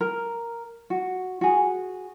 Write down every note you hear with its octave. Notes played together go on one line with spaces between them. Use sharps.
A#4
F#4
F#4 G#4